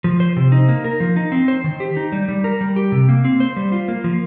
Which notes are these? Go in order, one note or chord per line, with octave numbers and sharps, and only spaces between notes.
F3
C5
C3
D#4
A#3
A#4
F3
D#4
C4
C5
D#3
G4
D#4
G3
G3
A#4
G3
G4
C3
A#3
C4
C5
G3
F4
A#3
F3